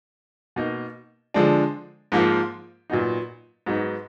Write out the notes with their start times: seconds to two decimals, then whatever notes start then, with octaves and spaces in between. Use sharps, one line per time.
0.56 B2 A#3 D#4
1.34 D3 F3 G#3 D4
2.12 G#2 F3 A#3 F4
2.90 A#2 F#3 B3 D#4
3.66 G#2 F#3 B3 D#4